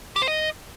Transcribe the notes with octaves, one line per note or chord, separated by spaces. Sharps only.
G4
C5
D#5